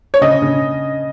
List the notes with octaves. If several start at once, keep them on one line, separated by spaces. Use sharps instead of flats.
C#5
C#3 D#5
C#3